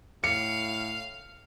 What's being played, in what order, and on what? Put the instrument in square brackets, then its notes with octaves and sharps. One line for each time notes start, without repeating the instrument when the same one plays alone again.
[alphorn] A2 [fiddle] F5 [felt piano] C#7